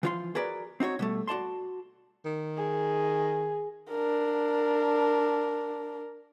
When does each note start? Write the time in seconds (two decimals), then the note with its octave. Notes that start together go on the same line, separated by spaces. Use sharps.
0.03 E3 F3 F4 F5 C6
0.35 F#4 G#4 A#4 B4 D5
0.80 C4 D#4 F#4 C#5
0.99 B2 G3 A3
1.27 F#4 D5 A5 C6
2.25 D#3
2.57 G#4
3.90 D4 A#4